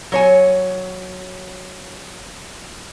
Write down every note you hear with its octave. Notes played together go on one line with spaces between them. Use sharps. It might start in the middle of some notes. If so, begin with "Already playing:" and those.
F#3 C#5 G#5